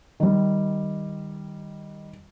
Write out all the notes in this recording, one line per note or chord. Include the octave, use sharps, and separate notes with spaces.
D#3 G3